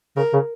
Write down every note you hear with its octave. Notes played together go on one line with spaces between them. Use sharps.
C#3 A#4
C#3